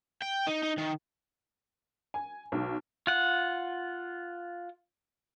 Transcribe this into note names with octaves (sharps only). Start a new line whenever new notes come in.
G5
D#4
D#4
D#3
G#5
B1
F4 F#5